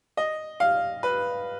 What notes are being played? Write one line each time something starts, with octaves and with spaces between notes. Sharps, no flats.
D#5
F5
B4